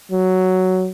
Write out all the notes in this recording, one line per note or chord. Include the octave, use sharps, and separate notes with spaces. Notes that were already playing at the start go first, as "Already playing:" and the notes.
F#3